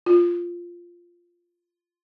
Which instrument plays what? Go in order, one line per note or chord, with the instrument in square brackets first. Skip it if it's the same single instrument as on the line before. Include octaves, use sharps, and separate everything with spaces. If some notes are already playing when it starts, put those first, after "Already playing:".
[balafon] F4